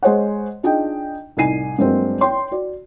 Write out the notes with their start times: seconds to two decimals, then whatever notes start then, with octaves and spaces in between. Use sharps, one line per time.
0.03 G#3 G#4 C5 C#5 D#5 F#5
0.63 D4 D#4 F4 G#4 D#5 G5
1.37 C2 A2 D#4 G#5 C7 D#7
1.78 G2 F#3 G#3 A#3 C4
2.21 C#5 G5 C6
2.51 F#4 D5